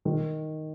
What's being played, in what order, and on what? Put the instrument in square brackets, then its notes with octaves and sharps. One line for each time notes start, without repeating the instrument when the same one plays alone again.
[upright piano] D#3